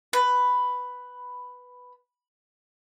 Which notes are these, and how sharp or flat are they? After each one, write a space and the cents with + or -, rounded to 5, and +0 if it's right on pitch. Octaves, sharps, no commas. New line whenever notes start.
B4 +5